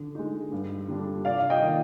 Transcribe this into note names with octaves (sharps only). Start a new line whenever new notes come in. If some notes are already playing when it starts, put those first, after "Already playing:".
Already playing: D3
G#3 D#4
G2
D3 G3 D4
C3 D5 F5
F5
D#5 G5
D#3 A#3